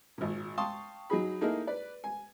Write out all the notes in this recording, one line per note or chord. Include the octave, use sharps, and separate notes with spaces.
G#1 A#2
F5 G5 A5 C6 C#6 D#6
F#3 D#4 G#4 B5
A3 A#3 D#4 E4 G#4 A#4
B4 D5
G#5